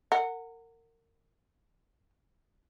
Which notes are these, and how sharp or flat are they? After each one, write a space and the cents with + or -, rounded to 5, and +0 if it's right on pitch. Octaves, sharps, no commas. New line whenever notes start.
A#4 -30 F#5 +0